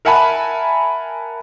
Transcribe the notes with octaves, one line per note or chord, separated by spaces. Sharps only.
A#4 E5 F#5 G#5 A5 B5